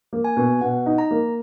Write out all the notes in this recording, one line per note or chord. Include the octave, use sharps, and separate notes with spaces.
A#3
G#5
B2
B2 F#5
D#4
A#5
A#3